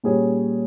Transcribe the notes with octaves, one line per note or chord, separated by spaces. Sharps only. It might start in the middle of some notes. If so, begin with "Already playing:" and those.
A#2 G3 C#4 G#4 C#5